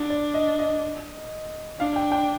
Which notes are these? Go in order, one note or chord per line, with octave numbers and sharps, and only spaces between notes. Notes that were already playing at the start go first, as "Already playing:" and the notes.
Already playing: D4
D5
D#5
D#5
D4 F5
G5
G5